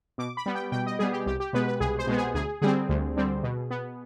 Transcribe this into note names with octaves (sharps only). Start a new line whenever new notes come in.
B2 D6
B5
G3 B3
G5
B2 G5
D#5
G3 B3 G#4
G4
C2 G4
G4
B2 G#3 B3 B4
B4
C2 G#4
C5
B2 G#3 B3
G#4
D2 G#4
D3 G3 C4 G#4
D2
D3 G3 C4
B2
B3